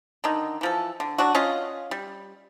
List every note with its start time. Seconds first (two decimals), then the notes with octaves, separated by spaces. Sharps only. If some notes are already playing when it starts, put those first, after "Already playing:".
0.24 D3 D#3 D#4
0.61 E3 F3 A4
1.00 D3
1.18 F#3 D4 F#4
1.35 C#4 F4 D#5 F5
1.91 G3